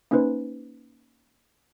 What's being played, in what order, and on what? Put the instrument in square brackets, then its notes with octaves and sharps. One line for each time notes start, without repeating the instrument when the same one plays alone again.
[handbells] A#3 C#4 D#4 B4 C5